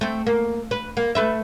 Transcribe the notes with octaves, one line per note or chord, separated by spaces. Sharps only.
A3 C4
A#3
B4
A#3
A3 B4 E5